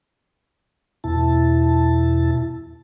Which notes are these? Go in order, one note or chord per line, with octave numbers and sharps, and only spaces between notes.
E2 B2 E4 A5